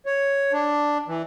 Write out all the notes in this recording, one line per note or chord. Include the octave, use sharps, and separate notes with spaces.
C#5
D4
E3